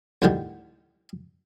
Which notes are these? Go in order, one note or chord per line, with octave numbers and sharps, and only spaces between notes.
D2 A2 D3 D#3 G3